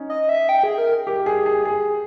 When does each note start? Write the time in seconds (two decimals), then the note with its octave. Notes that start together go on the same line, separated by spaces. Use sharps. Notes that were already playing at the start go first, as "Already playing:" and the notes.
Already playing: C#4 D#4
0.10 D#5
0.29 E5
0.49 G5
0.64 G#4
0.78 A#4
1.07 G4
1.26 G#4
1.46 G#4
1.65 G#4